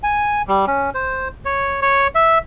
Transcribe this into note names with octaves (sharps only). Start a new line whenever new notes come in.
G#5
G3
C#4
C5
C#5
C#5
E5